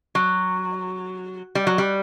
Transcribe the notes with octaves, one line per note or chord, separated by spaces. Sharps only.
F#3
G3
F#3
G3